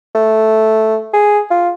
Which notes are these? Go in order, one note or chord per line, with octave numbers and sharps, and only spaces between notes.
A3
G#4
F4